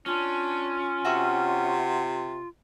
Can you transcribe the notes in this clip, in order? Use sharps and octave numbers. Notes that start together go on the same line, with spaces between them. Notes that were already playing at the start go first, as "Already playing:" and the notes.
C#4 D4 F4
C3 F#4 E5 C#6